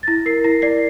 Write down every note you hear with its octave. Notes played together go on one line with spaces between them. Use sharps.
A6
E4 A#6
A#4 C7
E4 A#6
D5 C7